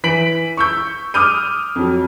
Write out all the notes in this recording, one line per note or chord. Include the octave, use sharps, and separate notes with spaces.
E3 B6 D7 F#7
C#6 E6 G6
D6 D#6 F6 G6 D#7
F2 F#3